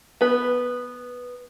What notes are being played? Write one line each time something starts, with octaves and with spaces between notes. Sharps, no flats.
B3 B4